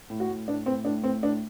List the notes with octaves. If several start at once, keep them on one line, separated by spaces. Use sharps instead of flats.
A2
F#4
A2
A2 D4
A2 C4
A2 D4
A2 C4
A2 D4